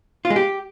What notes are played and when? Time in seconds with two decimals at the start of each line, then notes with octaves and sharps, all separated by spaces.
0.25 F4
0.30 G#3
0.36 G4